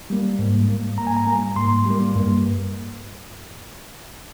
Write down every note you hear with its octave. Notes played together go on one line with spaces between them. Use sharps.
G3 A#3
G#2
G3 A#3
G#2 A#5
G#5
A#5
G3 A#3
G#2 C6
G3 A#3
G2